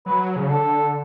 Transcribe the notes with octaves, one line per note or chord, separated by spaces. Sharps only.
F#3 B4
C#3
D3 A4